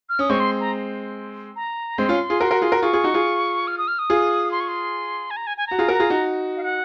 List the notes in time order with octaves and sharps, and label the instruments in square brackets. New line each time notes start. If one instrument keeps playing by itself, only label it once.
[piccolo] F6
[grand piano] C#4 [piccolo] D#6
[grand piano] G#3 C4 [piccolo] C#6
[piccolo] C6
A#5
A#5
[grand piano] G#3 C4 [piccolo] C6
[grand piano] C#4 F4
F4 G#4
F#4 A#4
F#4 A#4
F4 G#4
F#4 A#4
[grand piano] F4 G#4 [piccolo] C#6
[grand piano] F4 G#4
D#4 F#4
F4 G#4
[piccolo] F6
D#6
F6
D#6
[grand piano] F4 G#4
[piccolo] C6
C#6
C6
G#5
A#5
G#5
G#5
[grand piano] F#4 [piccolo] A#5
[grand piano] F4 G#4
F#4 A#4
F4 G#4
D#4 F#4
[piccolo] F5
F#5